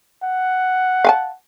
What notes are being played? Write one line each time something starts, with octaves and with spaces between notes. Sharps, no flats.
F#5
F5 G#5 A5